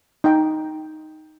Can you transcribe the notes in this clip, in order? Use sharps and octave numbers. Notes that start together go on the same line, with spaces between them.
D#4 G5